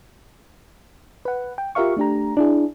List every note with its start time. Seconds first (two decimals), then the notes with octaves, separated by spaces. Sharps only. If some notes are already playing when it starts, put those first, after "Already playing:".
1.25 B4 F#5
1.58 G5
1.75 F4 G4 A#4 E5 F5 C#6
1.97 A3 D4 G4 A#5
2.37 D4 E4 G#4